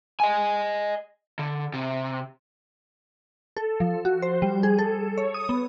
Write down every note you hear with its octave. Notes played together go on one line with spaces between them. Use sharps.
D#5 G#5
D3
C3
A4
F3
F#4
C5
G3
G#4
A4
C#5
D#6
B3